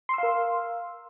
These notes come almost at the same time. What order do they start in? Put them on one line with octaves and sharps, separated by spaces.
C6 E6 F5 A#4